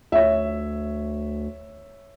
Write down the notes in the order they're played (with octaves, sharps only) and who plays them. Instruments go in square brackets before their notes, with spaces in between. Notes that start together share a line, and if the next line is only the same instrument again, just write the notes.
[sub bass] D2 [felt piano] C#5 E5